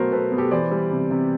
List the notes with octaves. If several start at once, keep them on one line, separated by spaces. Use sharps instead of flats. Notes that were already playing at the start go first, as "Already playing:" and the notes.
Already playing: B2 F#3 A3 A#4 C5
B2 A4 B4
B2
G4 A4
E3 C5 D5
G3
C3
C3